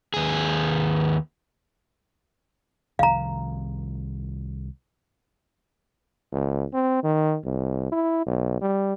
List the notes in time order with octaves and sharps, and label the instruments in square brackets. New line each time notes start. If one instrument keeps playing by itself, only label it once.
[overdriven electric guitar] D#2 G#4
[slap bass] C2 D#3 F3 [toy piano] F5 A#5
[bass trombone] C#2
C4
D#3
C2
E4
B1
G3